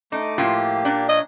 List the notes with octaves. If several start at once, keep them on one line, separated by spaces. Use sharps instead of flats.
A3 D#4 D6
A2 F3 A#3 F4 G4
A#2 D4
C#5 D#5